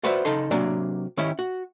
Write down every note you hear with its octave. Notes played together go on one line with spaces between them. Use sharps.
F4 F#4 B4 C5 D5 E5
C#3 D#4 A4 C6
C3 F#3 A#3 D4 D5 G#5
D#3 C#4 E4 G4
F#4